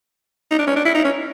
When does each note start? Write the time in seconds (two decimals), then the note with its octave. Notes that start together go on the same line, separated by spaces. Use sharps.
0.51 D#4
0.59 D4
0.67 C#4
0.76 D4
0.85 E4
0.95 D#4
1.05 C#4